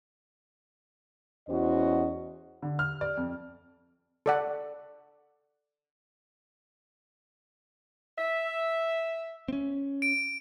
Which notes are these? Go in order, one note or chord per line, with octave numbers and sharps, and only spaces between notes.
E2 C#4 E4 F#4 C5 D#5
D3
F6
D5
F2
A4 D5 F#5
E5
C4 C#4
D7